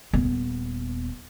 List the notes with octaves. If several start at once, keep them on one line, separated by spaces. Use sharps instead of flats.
D#1 B3